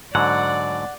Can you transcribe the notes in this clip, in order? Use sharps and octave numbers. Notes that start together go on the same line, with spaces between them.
G#2 D3 F#3 D5 F#5